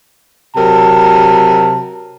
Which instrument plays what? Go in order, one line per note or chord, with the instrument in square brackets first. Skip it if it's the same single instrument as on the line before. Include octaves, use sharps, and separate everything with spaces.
[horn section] C3 F#3 A#4 A5